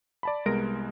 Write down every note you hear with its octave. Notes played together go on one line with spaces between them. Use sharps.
D5 A5 B5
C2 G#3 B3 A#4 A#6 D7